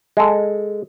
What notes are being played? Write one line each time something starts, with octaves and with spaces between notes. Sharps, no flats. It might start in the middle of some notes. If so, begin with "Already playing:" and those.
G#3 A4